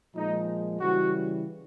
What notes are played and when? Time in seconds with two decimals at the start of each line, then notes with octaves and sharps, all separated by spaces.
0.15 A#2 F3 G#3 D#4
0.79 C#3 E3 G3 F#4